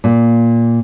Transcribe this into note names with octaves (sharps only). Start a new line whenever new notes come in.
A#2 A#3